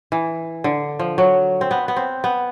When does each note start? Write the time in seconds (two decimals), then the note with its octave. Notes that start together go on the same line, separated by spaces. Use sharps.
0.12 E3
0.64 D3
0.99 F3
1.18 F#3
1.61 C4
1.71 B3
1.88 B3
1.96 C4
2.24 B3